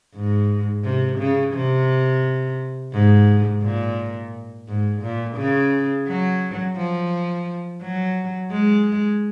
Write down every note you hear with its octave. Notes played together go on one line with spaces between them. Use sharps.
G#2
C3
C#3
C3
G#2
A#2
G#2
A#2
C#3
F#3
F3
F#3
G#3